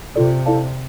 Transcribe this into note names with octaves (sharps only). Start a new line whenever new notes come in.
C3 F4 A4 D5
E4 A4 D5 F5 A5